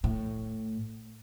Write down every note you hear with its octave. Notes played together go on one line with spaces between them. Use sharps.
A2